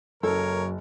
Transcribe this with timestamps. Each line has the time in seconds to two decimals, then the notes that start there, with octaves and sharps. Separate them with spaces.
0.23 F#1 F#2 A4 A#4 C#5